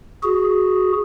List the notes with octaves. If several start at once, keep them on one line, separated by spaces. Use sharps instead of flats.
F#4 G#4